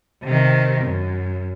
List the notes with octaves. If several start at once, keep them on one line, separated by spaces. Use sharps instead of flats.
C3 D#3
F#2